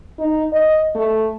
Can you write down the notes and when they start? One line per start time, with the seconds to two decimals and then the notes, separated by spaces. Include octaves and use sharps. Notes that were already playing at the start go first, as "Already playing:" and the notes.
0.19 D#4
0.53 D#5
0.96 A3